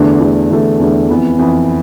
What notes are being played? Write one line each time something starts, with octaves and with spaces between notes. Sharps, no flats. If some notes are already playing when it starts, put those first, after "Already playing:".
Already playing: E2 D3 A3
E2 D3 A3
E2 D3 A3
E2 D3 A3
F2 E3 B3
F2 E3 B3